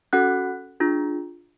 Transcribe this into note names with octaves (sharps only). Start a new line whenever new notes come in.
C#4 F#4 A4 F#5 F#6
D4 F4 G#4